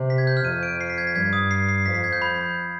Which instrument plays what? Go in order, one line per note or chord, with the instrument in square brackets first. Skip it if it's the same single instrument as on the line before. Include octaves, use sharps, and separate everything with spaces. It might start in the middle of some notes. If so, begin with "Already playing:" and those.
Already playing: [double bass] C3
[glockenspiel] B6
G#6
G6
F6
[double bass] F2 [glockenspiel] D#7
[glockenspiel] D7
C7
B6
G#6
B6
[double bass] G2 [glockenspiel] G#6
[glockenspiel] D#6
C7
C7
[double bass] F2 [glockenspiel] B6
[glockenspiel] C7
G#6
G6
B5